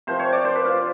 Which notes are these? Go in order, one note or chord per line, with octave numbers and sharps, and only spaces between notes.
C3 F3 C5
C#5
D5
C5
B4
F4